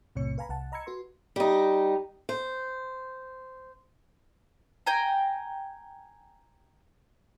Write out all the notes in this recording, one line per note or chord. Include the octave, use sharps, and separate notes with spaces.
B1 E2 A2 C3 C#5 C#7
B4 F5 G#5 A#5 B5
C2 F#5 A5
D#5 A#5 B5 E6 G#6 C#7
F#4 B4 C6
G3 D#4
C5
G5 G#5 A#5